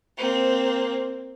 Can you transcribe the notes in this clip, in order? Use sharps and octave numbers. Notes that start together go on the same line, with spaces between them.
A#3 C4